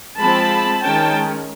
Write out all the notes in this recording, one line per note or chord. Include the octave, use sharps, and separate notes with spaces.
F3 G#3 C4 A5 B5
D#3 G#3 C#4 G5 A5